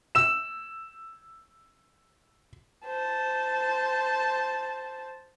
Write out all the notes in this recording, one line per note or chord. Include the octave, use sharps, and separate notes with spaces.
E6 E7
C5 A5